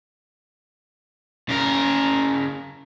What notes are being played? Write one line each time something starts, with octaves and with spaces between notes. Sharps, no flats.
C#3 A#4